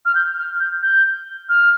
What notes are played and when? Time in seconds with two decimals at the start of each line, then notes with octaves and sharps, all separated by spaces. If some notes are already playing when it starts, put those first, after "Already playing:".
0.06 F6
0.15 G6
0.38 F6
0.60 G6
0.82 G6
1.49 F6